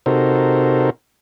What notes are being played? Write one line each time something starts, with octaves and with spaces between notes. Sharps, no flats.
C3 D#4 F#4 A4 A#4 C5